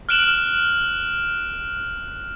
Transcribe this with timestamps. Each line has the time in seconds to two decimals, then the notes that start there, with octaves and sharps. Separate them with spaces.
0.09 F6 F#6 D7 E7 F#7